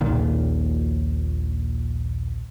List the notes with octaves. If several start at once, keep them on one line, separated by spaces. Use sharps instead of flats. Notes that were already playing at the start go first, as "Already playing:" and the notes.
A#1 D#2 A#2 D#3